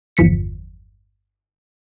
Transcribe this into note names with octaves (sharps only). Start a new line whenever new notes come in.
G1 E2 F3 B6 C#7